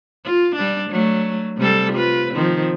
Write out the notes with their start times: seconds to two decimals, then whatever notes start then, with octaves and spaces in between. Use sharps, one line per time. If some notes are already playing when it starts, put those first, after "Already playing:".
0.24 F4
0.56 G3 D4
0.91 F#3 A3
1.58 C3 G3 A4
1.93 F4 B4
2.33 D#3 F3 C4